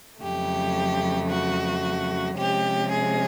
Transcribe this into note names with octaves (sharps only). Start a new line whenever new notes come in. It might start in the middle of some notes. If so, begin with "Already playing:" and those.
F2 C#3 F#3 A3 G4
F#4
C3 F3 G#3 C#4 G4
G#4